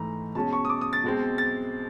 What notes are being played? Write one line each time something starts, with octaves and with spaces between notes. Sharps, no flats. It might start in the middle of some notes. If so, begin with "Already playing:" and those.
Already playing: G#2 E3 A3 A#5
B2 G#3 C#4 A5
C#6
D#6
D6
D#6
A6
B2 G#3 C4
A6